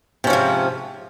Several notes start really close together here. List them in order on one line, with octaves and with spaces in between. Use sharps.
C3 C#4 F3 G#2